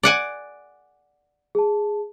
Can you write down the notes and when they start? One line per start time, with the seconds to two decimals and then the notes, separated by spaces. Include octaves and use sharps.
0.03 D5 F#5 G#5
1.55 G#4 A5